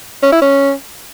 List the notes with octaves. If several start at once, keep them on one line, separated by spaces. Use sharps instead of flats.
C#4
E4
C#4